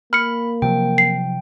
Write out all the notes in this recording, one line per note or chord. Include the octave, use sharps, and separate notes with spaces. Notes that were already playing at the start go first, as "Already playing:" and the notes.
A#3 B5 F6 C#7
C3 F3 F#3 G5
C7